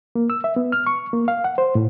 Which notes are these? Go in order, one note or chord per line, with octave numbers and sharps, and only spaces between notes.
A#3
E6
E5
B3
F6
C#6
A#3
F5
F#5
C5
A2